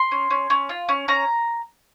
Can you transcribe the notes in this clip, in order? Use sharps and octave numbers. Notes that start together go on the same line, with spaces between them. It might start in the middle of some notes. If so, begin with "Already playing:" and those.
Already playing: C6
C#4
C#4
C#4
F4
C#4
C#4 A#5